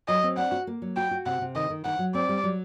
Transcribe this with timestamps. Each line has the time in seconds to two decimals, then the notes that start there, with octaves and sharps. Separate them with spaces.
0.08 F#3 D#5
0.23 C4
0.37 D4 F#5
0.52 F#4
0.67 A#3
0.82 F#3
0.97 F#4 G5
1.11 F#4
1.26 C3 F#5
1.41 C3
1.55 D#3 D#5
1.70 D#3
1.85 D#3 F#5
1.99 F#3
2.15 C4 D5
2.29 G3
2.44 F#3